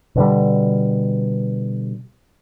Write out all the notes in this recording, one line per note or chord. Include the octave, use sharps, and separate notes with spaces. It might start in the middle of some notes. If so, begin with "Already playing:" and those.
B2 D3 G3